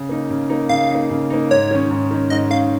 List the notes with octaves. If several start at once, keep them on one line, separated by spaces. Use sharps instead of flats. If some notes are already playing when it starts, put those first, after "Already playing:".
Already playing: C#3
A#3 D#4
C#3
A#3 D#4
C#3 F5
A#3 D#4
C#3
A#3 D#4
G#2 C#5
D#3 C#4
G#2
D#3 C#4
G#2 D#5
D#3 C#4 F5